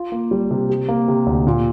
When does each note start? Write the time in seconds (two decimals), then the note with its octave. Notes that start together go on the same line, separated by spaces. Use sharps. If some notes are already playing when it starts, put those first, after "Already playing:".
Already playing: F4
0.12 A#3
0.31 G3
0.51 C3
0.70 G4
0.89 A#3
1.08 C3
1.27 D2
1.47 A#2